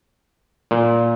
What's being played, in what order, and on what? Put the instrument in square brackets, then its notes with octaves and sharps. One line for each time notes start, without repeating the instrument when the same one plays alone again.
[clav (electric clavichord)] A#2